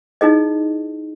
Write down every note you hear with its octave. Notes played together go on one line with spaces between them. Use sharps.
D#4 E4 G#4 D#5